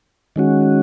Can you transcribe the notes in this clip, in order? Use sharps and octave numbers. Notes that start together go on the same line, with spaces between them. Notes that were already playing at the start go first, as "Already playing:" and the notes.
D#3 G#3 C#4 F#4